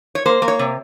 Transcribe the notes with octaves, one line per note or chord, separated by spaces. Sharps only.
C#5
A#3 C5
A#3
C#5
C3